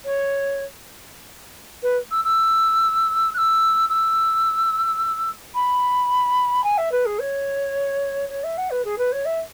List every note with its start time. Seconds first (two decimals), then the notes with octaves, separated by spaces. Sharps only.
0.05 C#5
1.83 B4
2.11 E6
2.24 E6
3.34 F#6
3.38 E6
3.89 E6
5.55 B5
6.64 G#5
6.78 E5
6.92 B4
7.06 G#4
7.19 C#5
8.30 C#5
8.44 E5
8.57 F#5
8.70 B4
8.85 G#4
8.98 B4
9.12 C#5
9.25 E5